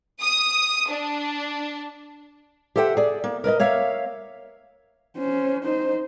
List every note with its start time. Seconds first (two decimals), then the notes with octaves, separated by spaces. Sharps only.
0.22 D#6
0.91 D4
2.76 G4 A4 C5 E5 F#5 G5
2.97 G#4 D5
3.24 A#3
3.44 A#4 B4 D5 D#5
3.59 A#3 C#5 E5 F5
5.18 C#4 C5
5.64 D#4 C5